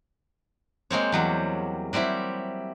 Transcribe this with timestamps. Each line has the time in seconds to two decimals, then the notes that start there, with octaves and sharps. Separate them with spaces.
0.90 G#3 A#3 C4 C#5
1.12 E2 F#3 G3
1.93 F#3 G3 C4 E4